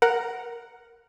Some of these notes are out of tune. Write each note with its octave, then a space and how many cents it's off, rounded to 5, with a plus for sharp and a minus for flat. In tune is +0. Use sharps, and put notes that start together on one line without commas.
A#4 +0 F#5 +0